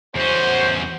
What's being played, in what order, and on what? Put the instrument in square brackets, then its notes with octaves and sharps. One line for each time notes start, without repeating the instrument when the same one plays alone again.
[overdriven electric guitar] E2 C#4 [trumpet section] F#4 C5